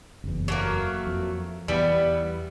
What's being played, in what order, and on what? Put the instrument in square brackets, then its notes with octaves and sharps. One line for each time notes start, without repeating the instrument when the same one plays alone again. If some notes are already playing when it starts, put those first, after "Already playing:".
[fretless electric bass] F#1 E2
[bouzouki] F#3 A3 A#3
[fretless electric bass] F2
[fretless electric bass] E2 [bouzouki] G3 B3 E4